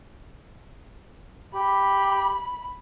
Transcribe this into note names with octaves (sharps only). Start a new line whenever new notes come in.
G4 B5